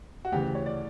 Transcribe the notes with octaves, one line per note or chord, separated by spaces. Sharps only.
F#4
D2 C#3 E3 G4
C#5
D5